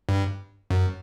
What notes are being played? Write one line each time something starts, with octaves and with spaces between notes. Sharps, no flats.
G2
F#2